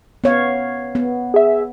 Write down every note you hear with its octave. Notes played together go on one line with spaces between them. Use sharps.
B3 C#5 F5
B3
G#4 E5